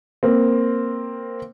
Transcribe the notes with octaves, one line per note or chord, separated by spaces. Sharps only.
A#3 C4